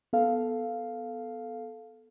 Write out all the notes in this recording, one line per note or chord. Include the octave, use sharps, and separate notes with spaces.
B3 A4 F5